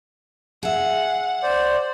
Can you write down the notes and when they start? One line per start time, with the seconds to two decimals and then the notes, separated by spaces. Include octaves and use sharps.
0.63 G#4 E5 F#5
1.43 C5 D5